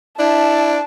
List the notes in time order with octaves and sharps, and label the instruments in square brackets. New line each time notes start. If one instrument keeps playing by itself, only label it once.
[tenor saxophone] D4 [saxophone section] E4 [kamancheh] A5